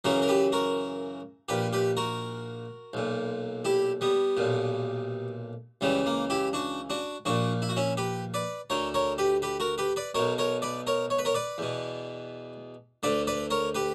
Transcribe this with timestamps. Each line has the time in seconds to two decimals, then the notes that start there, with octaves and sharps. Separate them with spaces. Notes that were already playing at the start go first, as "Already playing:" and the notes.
0.04 F#2 C#3 E3 F#4 A#4
0.22 A#4
0.28 G4 B4
0.52 F#4 A#4
1.48 A#1 A#2 G4 B4
1.73 G4 B4
1.97 F#4 A#4
2.93 B1 A#2
3.65 E4 G4
4.01 G3 B3
4.37 B1 A#2
5.81 C#2 C#3 E3 G3
6.06 A#3
6.30 E4 G4
6.53 D4 F#4
6.90 D4 F#4
7.25 A#1 A#2 D4 F#4
7.62 E4
7.69 F#4
7.77 C#4 E4
7.97 G4 B4
8.34 B4 D5
8.70 D2 D3 A#4 C#5
8.94 A#4 C#5
9.18 G4 B4
9.42 G4 B4
9.60 F#4 A#4
9.78 G4 B4
9.96 B4 D5
10.15 B1 B2 A#4 C#5
10.38 A#4 C#5
10.62 B4 D5
10.87 A#4 C#5
11.10 C#5
11.19 B4
11.25 A#4 C#5
11.35 B4 D5
11.58 E2 B2
13.03 D2 D3 B4 D5
13.27 B4 D5
13.50 A#4 C#5
13.75 G4 B4